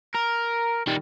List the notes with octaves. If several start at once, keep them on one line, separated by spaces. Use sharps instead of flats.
A#4
D#3 G3